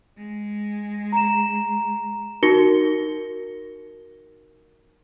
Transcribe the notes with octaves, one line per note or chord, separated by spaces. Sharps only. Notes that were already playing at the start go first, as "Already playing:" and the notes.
G#3
A#5 E7
D#4 F#4 A#4 A#6 C#7 G7